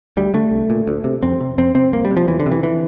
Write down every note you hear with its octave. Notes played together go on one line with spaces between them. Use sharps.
D2 G3
D3 A3
C2
A#2
D2
C3
F2 C4
C3
F2 C4
C3 C4
C2 A#3
G3
C3
F3
E2 E3
D3
C3
E3
E3